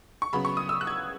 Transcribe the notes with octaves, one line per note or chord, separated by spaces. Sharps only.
C#6
C#3 F#3 B3 B5
C#6
D#6
E6
F#6
G#6